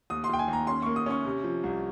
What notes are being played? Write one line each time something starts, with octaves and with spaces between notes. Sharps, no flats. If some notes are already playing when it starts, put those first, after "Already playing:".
D#2 D#6
C6
D#2 G5
G#5
D#2
A#5
C#4 C6
A#3 C#6
D#6
C#4 C#6
C3
F3
C2